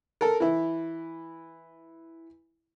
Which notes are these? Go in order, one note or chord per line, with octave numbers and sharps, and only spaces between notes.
A4 A#4
E3 E4